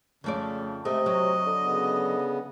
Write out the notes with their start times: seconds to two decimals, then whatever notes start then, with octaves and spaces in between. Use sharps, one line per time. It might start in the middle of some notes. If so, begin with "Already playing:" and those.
0.24 F2 C#3 A3 D5
0.85 C3 A3 D#5
1.06 F#3
1.47 D3
1.62 C#3 B3